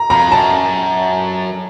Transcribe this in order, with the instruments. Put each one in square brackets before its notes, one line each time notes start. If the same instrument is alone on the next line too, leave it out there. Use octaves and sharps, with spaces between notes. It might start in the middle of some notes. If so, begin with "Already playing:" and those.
Already playing: [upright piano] A#5
[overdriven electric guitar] F2 [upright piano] A#5
[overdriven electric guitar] F#2 [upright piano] A5